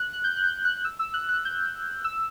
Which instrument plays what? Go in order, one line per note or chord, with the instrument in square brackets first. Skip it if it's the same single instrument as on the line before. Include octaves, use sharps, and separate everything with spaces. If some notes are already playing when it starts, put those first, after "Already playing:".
Already playing: [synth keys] F#6
F#6
G6
F#6
G6
F#6
E6
E6
F#6
F#6
G6
E6